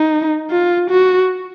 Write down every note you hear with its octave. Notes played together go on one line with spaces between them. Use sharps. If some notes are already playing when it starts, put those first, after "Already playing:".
Already playing: D#4
F4
F#4